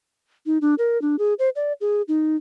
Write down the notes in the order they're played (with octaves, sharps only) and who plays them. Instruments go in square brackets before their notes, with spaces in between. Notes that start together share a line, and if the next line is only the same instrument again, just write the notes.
[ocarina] D#4
D4
A#4
D4
G#4
C5
D5
G#4
D#4